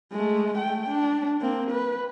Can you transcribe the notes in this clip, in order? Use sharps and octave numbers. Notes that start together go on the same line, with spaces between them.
G#3 A3
A3 G5
D4
A#3 C4
B4